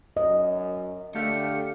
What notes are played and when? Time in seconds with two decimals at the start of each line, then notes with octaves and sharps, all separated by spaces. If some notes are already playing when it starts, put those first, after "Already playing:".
0.17 F#2 D#5
1.15 D3 A3 G4 F5 C#7